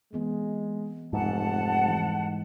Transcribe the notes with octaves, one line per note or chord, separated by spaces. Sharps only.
E3 G#3 B3 C4
F1 G#2 F3 A#3 B4 F#5 A5
E3 G3